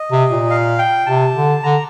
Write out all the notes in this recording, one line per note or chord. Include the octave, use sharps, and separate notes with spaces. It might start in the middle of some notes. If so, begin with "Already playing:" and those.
Already playing: D#5
C3
A#2
F5
G5
C3 A5
D3
D3 A#5